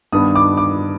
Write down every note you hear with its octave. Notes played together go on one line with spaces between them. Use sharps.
G2 D#3 B3 D4 D#6
D6
D6